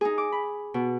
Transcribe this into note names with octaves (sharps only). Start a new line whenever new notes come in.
D#4 G#4
D6
B5
B2